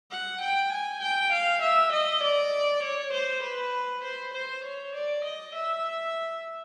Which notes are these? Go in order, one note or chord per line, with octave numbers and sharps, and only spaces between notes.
F#5
G5
G#5
G5
F5
E5
D#5
D5
C#5
C5
B4
C5
C5
C#5
D5
D#5
E5